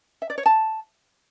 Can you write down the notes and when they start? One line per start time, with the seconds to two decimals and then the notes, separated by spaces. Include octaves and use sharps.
0.22 E5
0.30 D5
0.38 C#5
0.46 A5